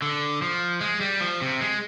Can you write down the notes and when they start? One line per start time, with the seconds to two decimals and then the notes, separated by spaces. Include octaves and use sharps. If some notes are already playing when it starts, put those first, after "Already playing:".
0.02 D3
0.42 F3
0.81 G#3
1.01 G3
1.21 F3
1.41 C3
1.61 G#3